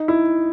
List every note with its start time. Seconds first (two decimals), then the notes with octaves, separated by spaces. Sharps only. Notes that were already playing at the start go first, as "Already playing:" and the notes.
Already playing: D#4
0.08 E4